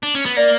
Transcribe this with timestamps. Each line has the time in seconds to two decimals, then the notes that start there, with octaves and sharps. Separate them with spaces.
0.03 D4
0.15 C#4
0.26 B3
0.36 A#3 D5